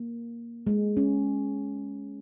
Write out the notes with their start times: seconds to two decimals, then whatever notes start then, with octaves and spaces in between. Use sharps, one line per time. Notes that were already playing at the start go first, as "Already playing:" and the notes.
Already playing: A#3
0.67 G#3
0.97 C#4